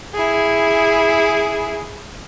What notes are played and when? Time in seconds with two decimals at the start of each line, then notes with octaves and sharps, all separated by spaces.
0.14 E4 G#4